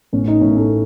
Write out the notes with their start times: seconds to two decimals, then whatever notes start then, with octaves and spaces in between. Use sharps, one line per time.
0.13 A1 A2 E3 C#4
0.28 D#4
0.41 A1 A2 E3 C#4
0.56 A3